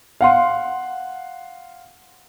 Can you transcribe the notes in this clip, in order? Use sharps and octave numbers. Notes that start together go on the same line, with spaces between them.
F5 F#5 C6